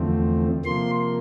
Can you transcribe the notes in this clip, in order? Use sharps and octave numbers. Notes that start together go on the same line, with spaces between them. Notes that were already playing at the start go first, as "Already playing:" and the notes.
Already playing: E2 D3 F3 A3 C4
C3 F3 A#3 C6